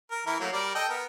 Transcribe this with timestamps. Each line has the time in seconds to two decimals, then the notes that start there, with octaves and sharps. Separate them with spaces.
0.11 A#4
0.27 E3 E4 A#4
0.40 F#3 A3 A#3
0.53 G3 A#4 D5
0.75 A4 D#5 G5
0.89 B3 A#4